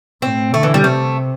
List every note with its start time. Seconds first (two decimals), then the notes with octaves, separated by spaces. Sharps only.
0.22 A2 C4
0.53 D3 A3
0.63 E3
0.74 G3
0.84 C3 A3